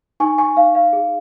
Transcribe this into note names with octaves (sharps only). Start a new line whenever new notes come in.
D#4 G#5 C#6
G#5 C#6
D#4 F5
F5
G#4